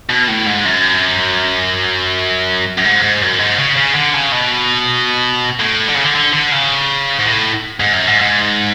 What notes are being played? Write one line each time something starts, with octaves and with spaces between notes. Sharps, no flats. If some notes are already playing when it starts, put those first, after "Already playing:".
B2
A2
G#2
F#2
F#2
G#2
G#2
F#2
G#2
C#3
C#3
D3
C#3
B2
A2
D3
C#3
D3
D3
D3
C#3
G#2
A2
G#2
F#2
G#2
G#2